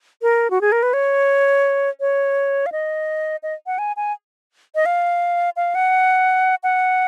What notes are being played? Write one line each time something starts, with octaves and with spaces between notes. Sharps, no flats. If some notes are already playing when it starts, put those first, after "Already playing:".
A#4
F#4
G#4
A#4
B4
C#5
C#5
F5
D#5
D#5
F#5
G#5
G#5
D#5
F5
F5
F#5
F#5